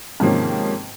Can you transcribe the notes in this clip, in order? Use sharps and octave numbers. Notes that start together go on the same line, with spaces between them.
G#2 C3 D#3 F3 A#3 C#4